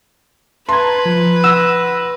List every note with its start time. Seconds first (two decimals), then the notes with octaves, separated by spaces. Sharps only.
0.69 B4 A5 A#5 C6 G#6
1.06 F3
1.44 F#5 E6 A#6 E7